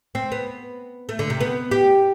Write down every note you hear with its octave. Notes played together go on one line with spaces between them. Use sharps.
C4
B3
A3
D3
C3
B3
G4